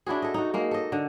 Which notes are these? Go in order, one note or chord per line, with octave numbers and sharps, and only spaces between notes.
D4 E4 F#4 G#4
A4 D#5
D#4 F#4
G#3 A#3 D#4
A4 D#5
D3